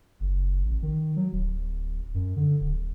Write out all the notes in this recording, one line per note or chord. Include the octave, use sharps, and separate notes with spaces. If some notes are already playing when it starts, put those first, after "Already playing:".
F#1
A1
D#3
F#3
D1
F#2
D3
D1